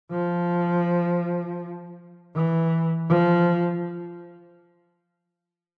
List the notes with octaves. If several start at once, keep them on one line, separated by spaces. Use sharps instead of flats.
F3
E3
F3